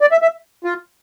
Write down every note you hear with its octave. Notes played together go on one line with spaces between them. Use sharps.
D5
E5
E5
F4